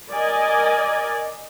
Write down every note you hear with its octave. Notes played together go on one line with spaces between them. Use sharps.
A#4 D5 D#5 G#5